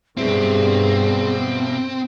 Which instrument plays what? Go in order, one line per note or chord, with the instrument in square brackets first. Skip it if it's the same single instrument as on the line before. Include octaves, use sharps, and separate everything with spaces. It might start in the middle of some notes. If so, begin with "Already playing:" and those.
[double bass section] G2 G3 [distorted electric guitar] B2 E4 [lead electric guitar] C4 [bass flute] G#4